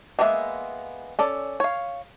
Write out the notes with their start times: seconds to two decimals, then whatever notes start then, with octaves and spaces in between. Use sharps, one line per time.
0.19 G#3 A#3 B3 A4 E5
1.19 C#4 A4 D5
1.60 C#5 F5